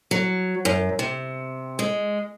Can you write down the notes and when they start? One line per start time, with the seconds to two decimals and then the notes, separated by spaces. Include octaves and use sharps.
0.11 F#3
0.65 F#2
0.99 C3
1.79 G#3